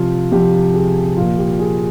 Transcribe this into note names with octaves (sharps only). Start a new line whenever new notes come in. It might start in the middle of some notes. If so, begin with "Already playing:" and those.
Already playing: C3 F3 F4
C3 F3 G4
G#4
A#2 F3 F4
G4
G#4